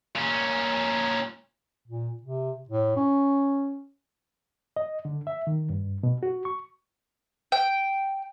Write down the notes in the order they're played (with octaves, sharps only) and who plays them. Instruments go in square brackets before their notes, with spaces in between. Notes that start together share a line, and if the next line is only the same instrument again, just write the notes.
[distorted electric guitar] A#2 C#4
[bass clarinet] A#2
C3
A2
C#4
[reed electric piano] D#5
D3
E5
D#3
G2
B2
F#4
C#6
[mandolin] G5